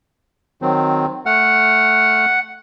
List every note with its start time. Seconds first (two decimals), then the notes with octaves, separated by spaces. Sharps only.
0.62 D#3 F#3 C4
1.26 A3 F#5 F6